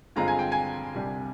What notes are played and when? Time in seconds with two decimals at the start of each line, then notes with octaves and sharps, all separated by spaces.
0.16 G2 D3 G#3 C4 F4 A#5
0.28 G#5
0.39 G5
0.52 G#5
0.95 C2 C3 G3 D4